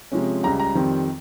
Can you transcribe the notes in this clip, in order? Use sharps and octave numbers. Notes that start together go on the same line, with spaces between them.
C3 F3 G#3 C#4
C#2 C#3 G3 A#5
A#5
F2 D#3 G3 C4